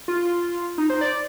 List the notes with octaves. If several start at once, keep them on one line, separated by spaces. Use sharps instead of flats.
F4
D#4
C5
D5